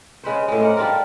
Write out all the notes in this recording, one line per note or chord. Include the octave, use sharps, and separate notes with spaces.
C#3 G#3 B4 C5
A2 G#3
G#2 A#4 F#5
G3 D4 F4 A#4